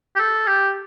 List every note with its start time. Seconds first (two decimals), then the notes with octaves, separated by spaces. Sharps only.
0.15 G4
0.19 A4
0.47 G4